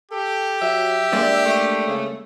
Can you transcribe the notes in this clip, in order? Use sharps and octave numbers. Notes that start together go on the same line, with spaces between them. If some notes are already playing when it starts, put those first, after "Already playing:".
G4 A4
F#3 E5
G#3 A#3 D4 D5
A3
C#3